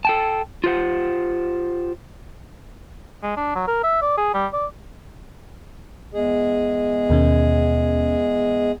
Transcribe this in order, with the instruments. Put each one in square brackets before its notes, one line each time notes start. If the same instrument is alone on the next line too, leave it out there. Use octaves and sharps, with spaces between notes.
[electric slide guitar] A4 G5 A5
F4 G4 C5 F#5
[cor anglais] G#3
D4
F#3
A#4
E5
D5
G#4
G3
D5
[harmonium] E2 G#3 G#4
[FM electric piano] D#2 B2 C#4